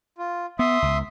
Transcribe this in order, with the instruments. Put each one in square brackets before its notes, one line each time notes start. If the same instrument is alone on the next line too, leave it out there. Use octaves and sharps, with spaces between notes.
[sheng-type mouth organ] F4
[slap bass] B3 [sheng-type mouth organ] E5 C6 D#6
[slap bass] C#2